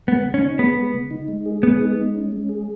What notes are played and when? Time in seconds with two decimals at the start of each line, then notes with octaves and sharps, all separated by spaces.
0.07 G#3 B3
0.25 C#3
0.34 C#4
0.42 D#4
0.59 B3 G#4
0.77 G#3
0.94 C#3
1.11 D#4
1.28 G#3
1.46 G#4
1.63 G#3 B3
1.81 D#4
1.97 G#3
2.15 C#4
2.32 G#3
2.49 G#4